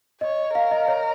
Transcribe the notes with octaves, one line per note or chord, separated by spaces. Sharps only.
C#5 D#5
A#4 F5
D#5
C#5